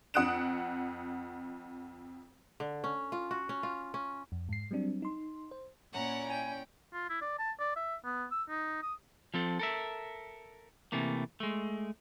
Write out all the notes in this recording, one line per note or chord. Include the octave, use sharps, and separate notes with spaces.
F2 F#5 D#6 F#6 D7 E7
D3
C#4
F4
F#4
C#4
F4
C#4
F2
G#2 C7
F#3 G3 C4 D4
D#4 C6
C5
A#2 C#4 E4 D5 F#5 A#5
G5 G#5
F4
E4
D5
A5
D5
E5
B3
E6
D#4
D#6
F3 C4 A4
A4 A#4 E5
C3 E3 A3 A#3
G#3 A3